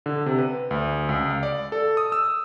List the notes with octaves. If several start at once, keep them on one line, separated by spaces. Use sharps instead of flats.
D3
C3
B4
D2
C#2
F5
D5
A4
D#6
E6